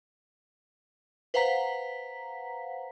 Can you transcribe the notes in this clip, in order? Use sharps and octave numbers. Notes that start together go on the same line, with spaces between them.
B4 C5 F5 F#5 A#5 B6